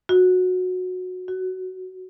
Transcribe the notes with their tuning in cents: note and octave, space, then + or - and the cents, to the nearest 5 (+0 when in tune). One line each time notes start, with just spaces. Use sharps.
F#4 -15
F#4 +10